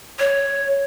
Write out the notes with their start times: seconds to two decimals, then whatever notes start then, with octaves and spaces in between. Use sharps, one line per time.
0.19 C#5